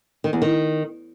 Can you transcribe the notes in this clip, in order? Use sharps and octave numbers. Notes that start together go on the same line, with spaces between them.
D#3
E2
D#3